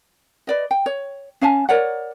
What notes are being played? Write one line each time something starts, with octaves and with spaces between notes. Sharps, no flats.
B4 D5 D#5
G5
C#5
C#4 F5 G#5 A5
A#4 C#5 D5 F#5